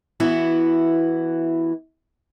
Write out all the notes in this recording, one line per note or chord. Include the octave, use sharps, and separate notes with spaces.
E3 B3 E4 F#4